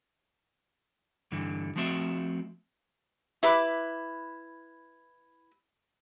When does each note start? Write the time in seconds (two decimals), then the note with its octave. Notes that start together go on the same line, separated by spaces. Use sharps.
1.32 G2 D3 E3
1.76 F3 A3 C4 F#4 E5
3.43 E4 B4 B5 D6